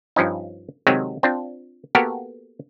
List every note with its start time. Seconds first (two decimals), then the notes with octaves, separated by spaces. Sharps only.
0.16 G2 F3 C#4 D#4
0.87 C3 D#3 F#3 G#3 C4
1.23 C4 D4 F4
1.95 A#3 B3 F#4 G4 A4 A#4